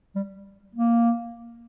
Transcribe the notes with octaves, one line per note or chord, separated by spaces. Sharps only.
G3
A#3